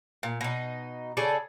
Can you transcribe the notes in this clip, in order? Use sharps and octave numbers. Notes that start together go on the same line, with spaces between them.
A#2
B2 D#4
C#3 G#4 A4 D5